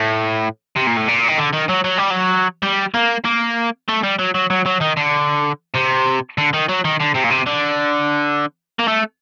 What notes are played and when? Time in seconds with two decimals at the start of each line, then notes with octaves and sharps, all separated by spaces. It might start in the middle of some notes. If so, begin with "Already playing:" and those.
Already playing: A2
0.76 C3
0.87 A#2
0.96 A2
1.08 A#2
1.28 D#3
1.38 D3
1.53 D#3
1.69 F#3
1.84 F#3
1.98 G3
2.11 F#3
2.63 G3
2.94 A#3
3.25 A#3
3.88 A3
4.03 G3
4.19 F#3
4.34 F#3
4.50 F#3
4.66 F#3
4.81 D#3
4.97 D3
5.75 C3
6.38 D3
6.54 D#3
6.69 F#3
6.85 D#3
7.01 D3
7.15 C3
7.25 A#2
7.31 C3
7.47 D3
8.79 A#3
8.88 A3